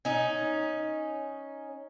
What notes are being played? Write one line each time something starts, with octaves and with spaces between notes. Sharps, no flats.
C#4 D#4